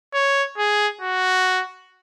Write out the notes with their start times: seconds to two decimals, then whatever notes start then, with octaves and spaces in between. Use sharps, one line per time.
0.14 C#5
0.58 G#4
1.01 F#4